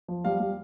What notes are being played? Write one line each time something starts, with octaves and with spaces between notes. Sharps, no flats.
F3
G3 F5
G3